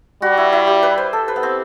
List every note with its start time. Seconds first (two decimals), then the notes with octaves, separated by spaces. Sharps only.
0.22 G3 F#4
0.37 E4
0.53 E4
0.67 G4
0.83 B4
0.98 C5
1.13 A4
1.28 B4
1.36 B3
1.43 C4